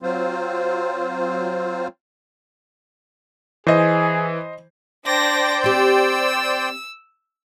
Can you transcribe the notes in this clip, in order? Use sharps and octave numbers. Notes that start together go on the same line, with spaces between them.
F#3 C4 F4 C5
E3 G#4 C5 D#5
D4 C5 D5 G5 A#6
C4 G4 E6